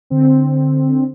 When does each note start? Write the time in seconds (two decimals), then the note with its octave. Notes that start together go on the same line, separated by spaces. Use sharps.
0.10 D3 C4